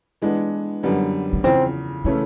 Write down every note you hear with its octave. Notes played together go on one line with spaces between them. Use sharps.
E3 G#3 B3 D4
F#2 D3 G3 B3
B3
E2 C#3 F3 C4
C#3 E3 A3 B3 C#4 E4